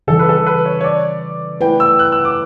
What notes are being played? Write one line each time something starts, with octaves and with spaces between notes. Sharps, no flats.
C#3 E3 G3 A4
B4
A4
B4
C#5
C#5
D5
A3 E4 B4 G5
E6
F#6
E6
D6